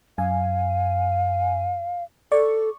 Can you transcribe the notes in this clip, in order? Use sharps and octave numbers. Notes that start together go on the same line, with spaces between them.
F#2 F5 G#5
A4 D5 C#6